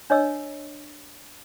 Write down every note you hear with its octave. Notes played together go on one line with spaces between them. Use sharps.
D4 C#5 D#5 E6